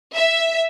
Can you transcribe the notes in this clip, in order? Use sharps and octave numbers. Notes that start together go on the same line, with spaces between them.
E5